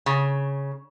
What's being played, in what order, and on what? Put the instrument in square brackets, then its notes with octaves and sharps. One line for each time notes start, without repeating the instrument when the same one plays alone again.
[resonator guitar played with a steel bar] C#3